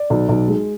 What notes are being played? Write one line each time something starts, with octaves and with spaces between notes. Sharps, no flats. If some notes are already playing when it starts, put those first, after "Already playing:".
Already playing: D5
B1
B1
G#3